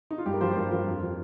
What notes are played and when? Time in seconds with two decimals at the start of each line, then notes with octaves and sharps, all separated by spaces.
0.11 D#4
0.18 F4
0.26 G2 G4
0.33 A#4
0.41 F3 G4 C5
0.52 C5
0.56 G2 F4 A#4
0.71 F3 F4 A#4
0.87 F2
1.02 F3